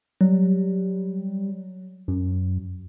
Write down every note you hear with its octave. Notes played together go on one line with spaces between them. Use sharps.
F#3 G3
F#2